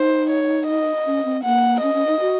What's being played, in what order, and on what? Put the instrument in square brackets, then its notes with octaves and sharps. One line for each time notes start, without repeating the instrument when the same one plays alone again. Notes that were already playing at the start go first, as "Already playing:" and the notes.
Already playing: [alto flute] D#4 [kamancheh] C5
[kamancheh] C#5
D#5
[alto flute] C#4
C4
[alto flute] A#3 [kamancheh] F#5
[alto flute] C#4 [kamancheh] D#5
[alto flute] C#4
D#4
F#4